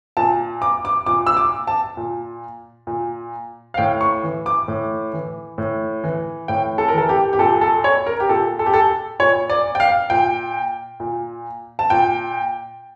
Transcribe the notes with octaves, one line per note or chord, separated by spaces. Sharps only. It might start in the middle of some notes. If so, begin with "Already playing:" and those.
A#2 A5
D6
D6
A#2 D6
E6
D6
A5
A#2
A#2
F5
A2 G5
C#6
E3
D6
A2
E3
A2
E3
A2 G5
A4
A#4
E3 A4
G4
G4
A#2 A4
A4
C#5
A#4
G4
A#2 A4
A4
G4
A4
A#2 C#5
D5
G5
F5
A#2 G5
A#2
A5
A#2 G5